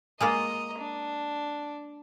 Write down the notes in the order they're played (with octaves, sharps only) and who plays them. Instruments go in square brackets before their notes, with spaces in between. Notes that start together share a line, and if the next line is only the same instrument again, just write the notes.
[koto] G#3 A#3 F4 [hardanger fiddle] D#5 A#5
[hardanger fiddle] D4